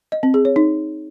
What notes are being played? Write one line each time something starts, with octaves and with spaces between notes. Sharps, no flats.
D#5
C4
G#4
C#5
D#4